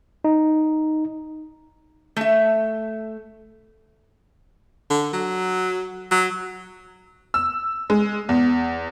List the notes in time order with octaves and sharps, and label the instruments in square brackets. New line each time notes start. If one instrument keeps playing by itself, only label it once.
[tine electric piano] D#4
[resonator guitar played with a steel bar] A3 E5
[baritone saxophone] D3
F#3
F#3
[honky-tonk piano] E6
G#3
E2